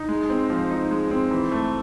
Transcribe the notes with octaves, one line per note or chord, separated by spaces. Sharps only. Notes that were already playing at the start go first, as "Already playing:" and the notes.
Already playing: D#4
G#3
C4
F3
D#4
G#3
C4
E3
A3